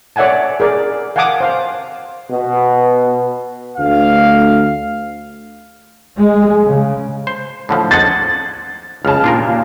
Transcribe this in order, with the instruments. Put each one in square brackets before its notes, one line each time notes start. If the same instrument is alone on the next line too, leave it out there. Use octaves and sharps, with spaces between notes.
[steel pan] C#5 D5 E5 F#5 G#5 A5
G#4 A#4 D5
F5 F#5 G#5 A5 D6 D#6
C5 F5
[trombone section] B2
[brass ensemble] D2 F5
[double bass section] G#3
C#3
[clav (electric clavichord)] C5
A2 D3 F3
[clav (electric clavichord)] C5 D#5 F#5 [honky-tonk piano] G#6 [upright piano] A6
[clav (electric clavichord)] C#2 C#3 [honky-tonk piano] A5 F6
[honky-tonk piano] D#2 A#2 [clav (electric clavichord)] D4 F4 A#4